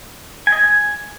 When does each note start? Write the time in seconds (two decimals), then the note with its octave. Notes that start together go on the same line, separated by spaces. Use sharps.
0.47 G#5
0.52 D#5
0.57 G#5